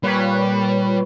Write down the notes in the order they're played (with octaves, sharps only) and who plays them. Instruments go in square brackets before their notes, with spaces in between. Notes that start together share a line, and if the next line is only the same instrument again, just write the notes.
[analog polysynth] A#2 B4 C#5 [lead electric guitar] G3